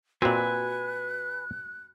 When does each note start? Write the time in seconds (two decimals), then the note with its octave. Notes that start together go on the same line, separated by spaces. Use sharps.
0.22 A#2 C4 F#4 B4 D#5 G#5 F#6